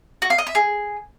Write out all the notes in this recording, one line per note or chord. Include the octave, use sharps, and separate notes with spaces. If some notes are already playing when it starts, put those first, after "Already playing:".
F#4
F5
D#5
E5
G#4